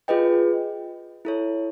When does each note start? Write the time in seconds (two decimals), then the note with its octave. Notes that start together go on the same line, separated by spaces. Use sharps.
0.08 F4 G#4 B4 D#5 G5
1.25 E4 A4 C#5